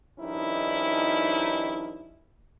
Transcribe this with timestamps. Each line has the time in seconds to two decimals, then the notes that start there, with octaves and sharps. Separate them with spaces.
0.19 G2 D#3 F3 C#4 D#4 E4